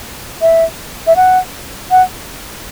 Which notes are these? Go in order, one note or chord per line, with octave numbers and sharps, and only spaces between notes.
E5
E5
F#5
F#5